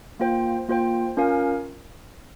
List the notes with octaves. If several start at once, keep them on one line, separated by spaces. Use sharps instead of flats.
A#3 F4 C5 G5
A#3 F4 C5 G5
C#4 F4 A#4 F5 G#5